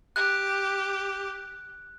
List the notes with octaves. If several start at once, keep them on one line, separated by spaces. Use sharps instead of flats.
G4 F#6